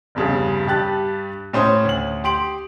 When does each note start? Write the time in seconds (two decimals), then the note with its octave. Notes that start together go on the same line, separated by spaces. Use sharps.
0.15 F1 E2 G2 C#3
0.67 G2 G3 G4 A5 F#6 A6
1.53 A2 C#4 C5 D#6
1.85 D2 F#7
2.24 G4 C6 D7 F#7